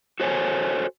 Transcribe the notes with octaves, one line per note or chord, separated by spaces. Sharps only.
F#4 A4 C5 C#5 G#5